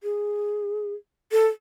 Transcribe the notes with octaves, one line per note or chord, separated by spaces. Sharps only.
G#4
A4